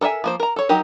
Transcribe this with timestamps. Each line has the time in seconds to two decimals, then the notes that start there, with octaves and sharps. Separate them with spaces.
0.01 A4 A#4 D#5 E5 G#5
0.24 F3 A#3 C5
0.40 A#4 A#5
0.56 A4 C#5
0.69 F#3 D#4 G4 A#4